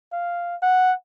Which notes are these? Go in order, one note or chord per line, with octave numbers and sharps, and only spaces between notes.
F5
F#5